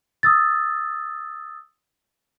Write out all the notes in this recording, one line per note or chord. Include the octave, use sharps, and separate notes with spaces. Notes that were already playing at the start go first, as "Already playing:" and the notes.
D#6 E6 A6